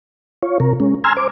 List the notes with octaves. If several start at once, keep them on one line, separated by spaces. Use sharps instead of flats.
F4 C#5
C3 A#4
G#3 C#4
G#5 A#5 C6 E6 F6 G#6
C5 D6